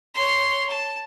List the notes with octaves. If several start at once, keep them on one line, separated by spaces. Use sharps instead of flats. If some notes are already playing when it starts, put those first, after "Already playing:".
C#5 C6
A5